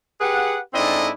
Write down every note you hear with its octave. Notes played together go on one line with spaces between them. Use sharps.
G4 G#4 B4 F#5
G#2 C4 D4 E4 A4 D#5